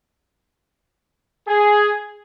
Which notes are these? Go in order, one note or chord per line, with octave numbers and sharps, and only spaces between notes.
G#4